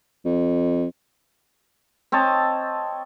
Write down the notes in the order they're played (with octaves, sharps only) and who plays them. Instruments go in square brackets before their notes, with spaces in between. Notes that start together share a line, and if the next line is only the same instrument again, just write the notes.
[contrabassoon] F2
[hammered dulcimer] C4 C#5 D#5 A5